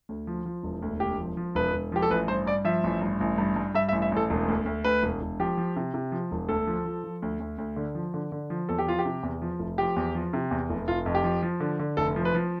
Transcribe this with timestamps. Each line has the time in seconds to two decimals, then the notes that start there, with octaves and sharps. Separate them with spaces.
0.09 D2
0.27 F3
0.46 F3
0.63 E1
0.82 D2
1.00 E1 G4
1.19 F3
1.37 F3
1.55 E1 B4
1.73 E1
1.92 F3 G4
2.02 A4
2.10 A1 B4
2.28 G2 C5
2.47 G2 D5
2.65 F3 E5
2.84 A1
3.02 G2
3.21 A1
3.38 G2
3.56 G2
3.75 G2 E5
3.89 E5
3.92 A1
4.02 E5
4.12 A1 A4
4.30 E1
4.48 D2
4.66 D2
4.84 D2 B4
5.03 E1
5.22 E1
5.39 F3 G4
5.57 F3
5.76 C3
5.94 C3
6.12 F3
6.31 E1
6.48 D2 A4
6.67 F3
6.85 F3
7.04 F3
7.22 D2
7.40 D2
7.58 D2
7.76 D3
7.95 F3
8.14 D3
8.32 D3
8.50 F3
8.69 E2 A4
8.79 G4
8.86 F3 F4
8.99 G4
9.05 C3
9.23 E2
9.42 F3
9.59 F1
9.78 F3 G4
9.96 E2
10.15 F3
10.33 C3
10.51 E2
10.70 F1
10.88 F1 F4
11.06 F2
11.15 G4
11.24 F3
11.42 F3
11.60 D3
11.79 D3
11.97 F1 A4
12.16 F3
12.25 B4
12.35 F3